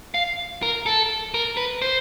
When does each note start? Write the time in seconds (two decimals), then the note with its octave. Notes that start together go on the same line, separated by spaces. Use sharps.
0.14 F5
0.63 A#4
0.86 A4
1.34 A#4
1.57 B4
1.82 C5